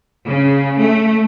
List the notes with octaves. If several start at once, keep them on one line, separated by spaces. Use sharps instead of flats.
C#3
A3